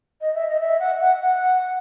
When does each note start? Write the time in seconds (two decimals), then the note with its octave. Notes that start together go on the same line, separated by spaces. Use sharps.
0.21 D#5
0.35 E5
0.48 D#5
0.60 E5
0.80 F#5
1.01 F#5
1.23 F#5